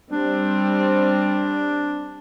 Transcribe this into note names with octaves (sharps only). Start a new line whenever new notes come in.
G3 C4 D4